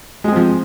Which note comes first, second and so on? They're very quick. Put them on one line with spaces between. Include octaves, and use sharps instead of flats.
G#3 G#4 C4 F3